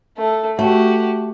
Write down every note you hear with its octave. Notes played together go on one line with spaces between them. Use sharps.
A3
A3 F#4 G4